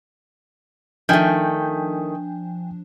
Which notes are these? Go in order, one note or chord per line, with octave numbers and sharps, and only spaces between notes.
D#3 F3 A3 D4 G5 G#5 G6